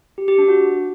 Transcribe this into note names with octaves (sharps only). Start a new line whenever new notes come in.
G4
G4
D4
F#4